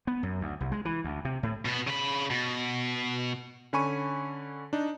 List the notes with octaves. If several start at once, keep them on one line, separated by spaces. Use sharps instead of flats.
B3
F#2
D2
C2
G#3
E3
D2
C3
A2
B2 B3
C#3 B5
B2
D3 C#4 G#5 B5 C#6 D#7
D4 D#4